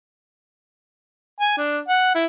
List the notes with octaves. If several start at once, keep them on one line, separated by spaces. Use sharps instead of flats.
G#5
D4
F#5
E4